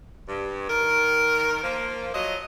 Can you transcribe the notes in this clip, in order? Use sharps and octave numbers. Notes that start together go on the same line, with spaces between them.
G2
D#3 A#4
F3 A#3
F3 F#3 D#5